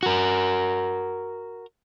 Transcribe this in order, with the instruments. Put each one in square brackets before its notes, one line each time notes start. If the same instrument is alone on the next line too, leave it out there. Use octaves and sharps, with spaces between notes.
[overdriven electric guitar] F#4 A#4